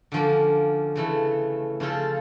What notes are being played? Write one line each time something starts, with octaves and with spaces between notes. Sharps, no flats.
D3 F3 A#3 C#4
C#3 E3 A3
C#3 F3 C#4 F4 A4